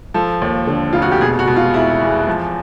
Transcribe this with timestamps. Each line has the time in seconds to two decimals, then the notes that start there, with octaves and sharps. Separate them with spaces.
0.14 F3 A4
0.41 D#2
0.67 D3
0.93 F1 F4
1.02 F#4
1.12 G4
1.21 B2 G#4
1.39 F#4
1.47 B2
1.56 F4
1.74 E2 E4
2.01 E2
2.28 F3